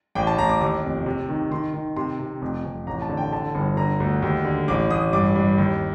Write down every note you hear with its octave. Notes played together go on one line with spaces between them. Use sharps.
A1 G5
A5
A1 A#5
D6
D#2 D6
F1
C3
D#3
D#3 C6
D#3
C3 C6
C3
F1
F1
A1 A#5
A5
D3
G5
D3 A5
G1
D3 A#5
D2
D#2
D3
A1 D6
A1 D#6
G2 D6
G2
D#2